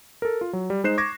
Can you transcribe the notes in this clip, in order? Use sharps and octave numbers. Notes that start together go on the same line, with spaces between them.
A4 A#4
F4
F#3
G3
G#3 D#4 C5 F#6 C7 E7
C#6 D6 G#6 A#6